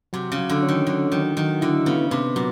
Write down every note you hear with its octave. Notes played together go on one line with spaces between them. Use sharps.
C3 F#3
C#3
F#3
D3
C#4
D#3
D3 F#3
D#3 F#3
D#3 F#3
D3 E4
C#3 B3
C3 B3
A#2 F#3